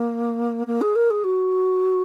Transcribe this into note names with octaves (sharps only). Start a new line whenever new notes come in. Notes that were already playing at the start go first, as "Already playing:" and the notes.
Already playing: A#3
A#3
G#4
A#4
G#4
F#4